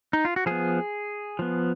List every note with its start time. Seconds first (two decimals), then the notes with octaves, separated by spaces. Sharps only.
0.13 D#4
0.25 F4
0.36 F#4
0.46 F3 B3 G#4
1.39 F3 B3